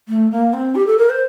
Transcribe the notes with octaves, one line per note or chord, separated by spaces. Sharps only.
A3
A#3
C4
G4
A4
A#4
C5